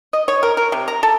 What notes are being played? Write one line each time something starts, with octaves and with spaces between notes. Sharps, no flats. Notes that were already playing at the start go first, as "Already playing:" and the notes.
D#5
C#5
A#4
A#4
C3
A#5
A4